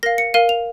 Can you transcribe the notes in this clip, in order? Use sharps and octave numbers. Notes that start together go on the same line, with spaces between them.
A#4 F5 A#6
C#7
A#4 F5 D#7
F7